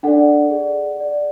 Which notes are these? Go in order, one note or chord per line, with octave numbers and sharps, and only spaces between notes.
D4 A4 D5 F#5
G#4 D5
G#4 D5